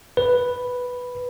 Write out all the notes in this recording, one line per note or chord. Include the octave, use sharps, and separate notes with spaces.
B4